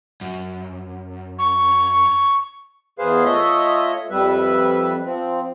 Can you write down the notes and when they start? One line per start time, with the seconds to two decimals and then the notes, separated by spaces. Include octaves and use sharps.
0.21 F#2
1.39 C#6
2.99 E2 G#4 B4 C5 F5
3.24 A3 F4 C#5 D#5 E5
4.10 F2 G3 B4 E5
5.05 F3 C4